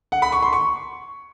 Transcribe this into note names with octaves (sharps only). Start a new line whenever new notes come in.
F#5
B5
C#6
C6
C#6